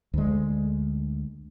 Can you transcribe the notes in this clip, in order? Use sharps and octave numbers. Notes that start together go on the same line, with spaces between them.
D2 G#3